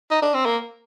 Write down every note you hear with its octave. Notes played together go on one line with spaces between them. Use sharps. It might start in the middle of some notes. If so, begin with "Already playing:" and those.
D#4
D4
C4
A#3